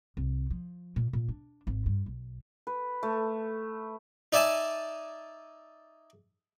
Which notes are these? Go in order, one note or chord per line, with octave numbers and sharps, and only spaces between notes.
C2
F3
A#2
A#2
D4
G#1
G2
B1
B4
A3
D#4 D5 E5 G#5 A5